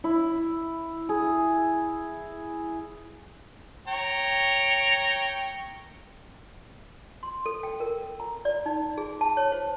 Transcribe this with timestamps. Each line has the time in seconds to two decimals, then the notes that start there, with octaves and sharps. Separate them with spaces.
0.04 E4
1.09 G#4
3.88 C#5 G5 A#5
7.23 C6
7.46 A4
7.63 G5
7.80 A#4
8.20 A#5
8.45 D5
8.66 D#4
8.98 G#4
9.21 A5
9.37 C#5
9.52 C5